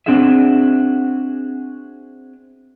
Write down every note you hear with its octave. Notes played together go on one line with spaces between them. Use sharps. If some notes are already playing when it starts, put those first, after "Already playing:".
C4 D4 F#4 G#4 E5